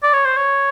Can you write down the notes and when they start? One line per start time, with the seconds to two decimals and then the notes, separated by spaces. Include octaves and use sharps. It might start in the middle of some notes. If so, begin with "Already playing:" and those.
0.03 D5
0.14 C#5
0.25 C5
0.37 C#5